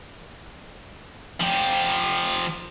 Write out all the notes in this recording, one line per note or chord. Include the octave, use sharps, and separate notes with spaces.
F3 G4